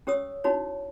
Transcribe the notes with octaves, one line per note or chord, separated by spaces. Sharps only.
C#4 G4 C#5 D#6 E6
C#4 D#4 E4 F#4 C#5